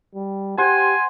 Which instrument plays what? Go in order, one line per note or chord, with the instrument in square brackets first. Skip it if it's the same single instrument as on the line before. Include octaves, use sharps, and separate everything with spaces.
[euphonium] G3
[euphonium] G4 [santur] C5 F#5 [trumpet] G#5